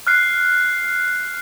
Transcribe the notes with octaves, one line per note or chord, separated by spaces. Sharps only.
F6 F#6 C7